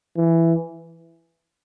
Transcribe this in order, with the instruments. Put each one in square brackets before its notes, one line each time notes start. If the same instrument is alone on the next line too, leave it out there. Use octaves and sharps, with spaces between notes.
[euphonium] E3